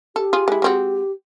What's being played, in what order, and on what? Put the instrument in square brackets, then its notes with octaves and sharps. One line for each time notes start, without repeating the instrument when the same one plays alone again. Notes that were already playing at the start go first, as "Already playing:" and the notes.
[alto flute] G4 [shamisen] A4
[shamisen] F4 G#4
G#3 E4
G#3 C4 F#4